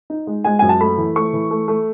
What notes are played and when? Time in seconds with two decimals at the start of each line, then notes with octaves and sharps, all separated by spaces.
0.10 D#4
0.27 G#3
0.44 G#3 G#5
0.59 F#2 G#5
0.69 A5
0.81 A3 B5
0.98 E3
1.16 A3 C#6
1.33 E3
1.51 A3
1.68 A3